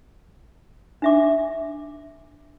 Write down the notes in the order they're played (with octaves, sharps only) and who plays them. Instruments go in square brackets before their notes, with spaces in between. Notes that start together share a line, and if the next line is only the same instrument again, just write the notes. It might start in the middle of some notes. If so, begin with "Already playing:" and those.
[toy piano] D4 E5 D6